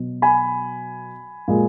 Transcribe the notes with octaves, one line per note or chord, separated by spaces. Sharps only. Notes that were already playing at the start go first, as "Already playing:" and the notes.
Already playing: B2 F#3
G#5 B5
A#2 G#3